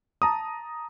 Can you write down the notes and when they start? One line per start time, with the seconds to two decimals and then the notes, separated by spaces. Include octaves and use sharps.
0.22 A5 A#5 D#6